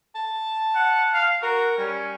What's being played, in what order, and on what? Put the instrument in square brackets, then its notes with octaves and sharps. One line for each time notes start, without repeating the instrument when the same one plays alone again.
[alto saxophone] A5
[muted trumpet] F#5
F5
[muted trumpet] F#4 [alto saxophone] A#4
[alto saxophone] G3 [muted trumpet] C#4